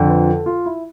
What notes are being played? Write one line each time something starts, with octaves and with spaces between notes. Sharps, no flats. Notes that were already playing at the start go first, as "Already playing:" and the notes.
Already playing: F2 D3 F3
B4
A4
F4
E4